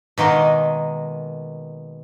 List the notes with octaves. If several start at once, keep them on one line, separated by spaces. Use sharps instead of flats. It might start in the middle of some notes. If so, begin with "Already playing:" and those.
B2 D#3 G#3 A#3